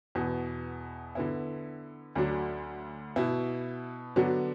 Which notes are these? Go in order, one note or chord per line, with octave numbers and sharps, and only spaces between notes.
E2 B2 B3
D3 B3 E4
D2 D3 F#3 D4
B2 B3 E4
D3 F#3 B3 D4 F#4